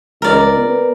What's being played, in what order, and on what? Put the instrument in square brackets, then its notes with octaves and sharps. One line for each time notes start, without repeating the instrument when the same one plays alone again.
[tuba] C#2 [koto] A#4 D5
[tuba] B3